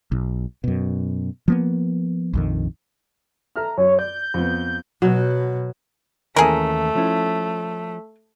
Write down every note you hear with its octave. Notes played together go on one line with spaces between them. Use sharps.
B1
F#2 B2
F3 A#3 B3
A#1 F2 D#3
A4 E5 A#5 F6
F#2 C#5
D5 G6
F2 B3
B2 F#3
D#2 E3 A3 C#4 G#4 A#4
F3 C#4 E4